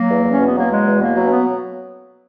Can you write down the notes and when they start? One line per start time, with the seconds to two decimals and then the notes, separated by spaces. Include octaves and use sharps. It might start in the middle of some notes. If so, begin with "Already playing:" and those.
Already playing: F#3 A#3
0.09 E2
0.24 E2
0.31 C#4
0.39 B2 B3
0.54 F#3 A#3
0.70 E2 G#3
0.85 E2
1.00 B2 A#3
1.16 F#3
1.26 C#4
1.31 B3